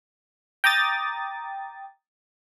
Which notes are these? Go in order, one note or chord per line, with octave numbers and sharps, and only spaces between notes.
G5 A#5 D6 D#6 A6